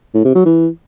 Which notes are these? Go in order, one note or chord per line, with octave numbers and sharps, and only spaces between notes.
A2
C3
F#3
E3